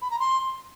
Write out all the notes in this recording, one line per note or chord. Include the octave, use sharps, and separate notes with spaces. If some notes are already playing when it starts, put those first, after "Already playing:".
B5
A#5
C6